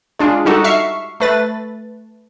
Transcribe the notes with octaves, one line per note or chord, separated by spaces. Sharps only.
G#3 D4 F4
G3 D#4 F#4 A4
E5 C#6 F6 C7
A3 B4 A6